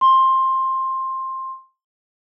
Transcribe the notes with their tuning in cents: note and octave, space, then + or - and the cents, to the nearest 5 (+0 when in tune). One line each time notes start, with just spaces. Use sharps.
C6 +15